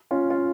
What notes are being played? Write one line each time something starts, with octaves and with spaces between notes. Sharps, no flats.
C#4 F4
F4